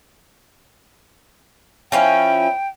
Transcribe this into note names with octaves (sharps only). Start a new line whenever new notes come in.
F3 C#4 E4 G5